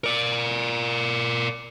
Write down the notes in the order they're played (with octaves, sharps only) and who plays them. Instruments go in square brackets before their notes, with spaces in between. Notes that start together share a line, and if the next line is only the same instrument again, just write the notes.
[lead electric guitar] A#4 D5